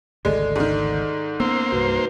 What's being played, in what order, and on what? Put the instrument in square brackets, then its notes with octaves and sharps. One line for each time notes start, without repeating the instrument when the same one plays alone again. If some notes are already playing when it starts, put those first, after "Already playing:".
[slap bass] G#1 D2 C#3 [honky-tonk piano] G#3 [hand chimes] A4 D5
[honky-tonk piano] G#2 D#3
[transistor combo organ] A#3 C5 [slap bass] B3 C#4 [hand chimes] E6
[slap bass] C2 G2 [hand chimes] F#4 B4